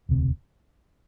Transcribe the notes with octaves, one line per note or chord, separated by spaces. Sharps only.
E1 D2 C3